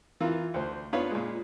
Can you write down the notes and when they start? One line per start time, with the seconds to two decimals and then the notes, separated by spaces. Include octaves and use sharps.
0.20 E3 F4 A#4
0.54 D2 C5
0.93 B3 D4 F4 B4 C#5 F5
1.11 A#2 G#3